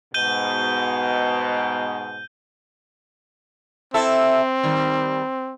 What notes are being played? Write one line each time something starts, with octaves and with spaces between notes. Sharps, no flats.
G#2 B2 G6 D#7 G7
C4 E4 A4 E5
D#3 G3